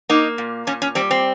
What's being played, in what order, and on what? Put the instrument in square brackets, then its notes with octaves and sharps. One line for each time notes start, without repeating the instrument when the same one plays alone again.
[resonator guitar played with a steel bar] A#3 D#4
A#2
A#2 C#4
C#4
G3 C4
C4